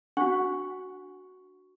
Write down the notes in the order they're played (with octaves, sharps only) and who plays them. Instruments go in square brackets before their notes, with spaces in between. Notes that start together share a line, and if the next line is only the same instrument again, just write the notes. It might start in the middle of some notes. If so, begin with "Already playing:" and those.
[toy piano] D4 [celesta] F#4 C#6 [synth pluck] F#5